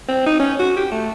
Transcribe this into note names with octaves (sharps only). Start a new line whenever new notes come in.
C4
D#4
C#4
F#4
G4
A3